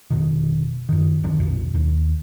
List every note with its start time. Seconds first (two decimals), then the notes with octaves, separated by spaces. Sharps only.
0.10 F1 B2 D#3
0.89 F#2 D#3
1.23 C2 D#3 F3
1.39 A#1 F2 B2
1.74 D#2